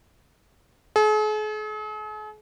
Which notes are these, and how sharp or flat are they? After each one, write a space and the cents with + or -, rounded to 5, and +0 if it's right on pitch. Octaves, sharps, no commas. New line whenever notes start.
G#4 +45